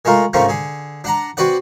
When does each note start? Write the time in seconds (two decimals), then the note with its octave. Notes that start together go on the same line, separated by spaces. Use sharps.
0.05 G#3 A3 F4 A#4
0.33 G#2 A3 A#3 C4 C#4 F4
0.48 D3 G#4
1.04 D4 F#5 A#5
1.37 C4 F#4 B4 D5 F#5